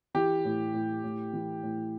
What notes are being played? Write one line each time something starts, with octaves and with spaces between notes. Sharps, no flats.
E3 G4
A2
A2
A2
E3
A2